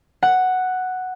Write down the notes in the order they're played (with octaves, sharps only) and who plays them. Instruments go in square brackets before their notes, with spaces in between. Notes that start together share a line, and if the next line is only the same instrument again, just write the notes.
[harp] F#5